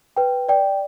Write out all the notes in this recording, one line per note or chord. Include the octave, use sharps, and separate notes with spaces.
B4 G5
D5 G5